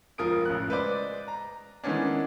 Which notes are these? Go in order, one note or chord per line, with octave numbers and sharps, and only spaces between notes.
E1 F3 A#4 D#6 D7
A1 C#3 F#6
G#3 B4 C5 D5
A#5
D#3 E3 G#3 B3 C#4 D4